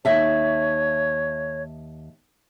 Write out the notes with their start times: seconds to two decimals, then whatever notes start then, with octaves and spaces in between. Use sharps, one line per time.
0.05 D#2 C#5 E5 A5